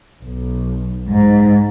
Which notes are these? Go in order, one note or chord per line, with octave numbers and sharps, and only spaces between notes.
B1
G#2